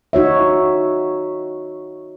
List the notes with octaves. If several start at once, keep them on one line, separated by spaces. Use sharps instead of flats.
D#4 F#4 C#5 E5